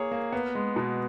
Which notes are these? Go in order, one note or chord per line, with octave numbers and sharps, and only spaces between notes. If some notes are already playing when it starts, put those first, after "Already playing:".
Already playing: A#3 G#4 C#5
A#3
B3
G#3
B2